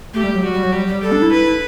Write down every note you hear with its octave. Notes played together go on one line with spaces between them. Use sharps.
A3 G4
G3
F#3
G3 F#4
G3
F#3
G3 G4
G3
G3 A4
D4
E4
B4